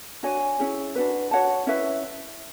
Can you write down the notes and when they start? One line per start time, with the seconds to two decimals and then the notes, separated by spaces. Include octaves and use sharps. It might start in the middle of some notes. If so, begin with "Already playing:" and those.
0.23 D4 F#4 C#5 G#5
0.59 C#4 E4 G#4
0.95 D4 F#4 B4
1.31 F#4 C#5 F#5 A5
1.67 C#4 E4 B4 E5